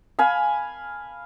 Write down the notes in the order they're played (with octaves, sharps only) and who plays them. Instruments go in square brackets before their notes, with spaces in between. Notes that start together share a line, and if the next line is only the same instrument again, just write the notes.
[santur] F5 G#5 B5